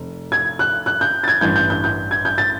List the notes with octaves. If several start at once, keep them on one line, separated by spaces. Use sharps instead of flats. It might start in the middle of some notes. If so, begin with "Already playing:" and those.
Already playing: F1
G#6
F#6
F#6
G6
A6
G#6
A1 G2 E3 G6
G6
G6
G6
G#6
G6
A6